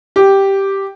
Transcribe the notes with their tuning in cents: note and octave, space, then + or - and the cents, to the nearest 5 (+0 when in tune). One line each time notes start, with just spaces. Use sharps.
G4 -5